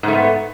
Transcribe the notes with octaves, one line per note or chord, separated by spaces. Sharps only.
G#2 A3 B3